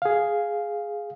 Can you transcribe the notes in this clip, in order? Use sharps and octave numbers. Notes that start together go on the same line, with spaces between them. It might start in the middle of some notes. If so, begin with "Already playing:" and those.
G#4 F5